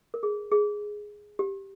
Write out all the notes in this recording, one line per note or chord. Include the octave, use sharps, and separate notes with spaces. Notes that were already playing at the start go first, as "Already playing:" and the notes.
A#4
G#4
G#4
G4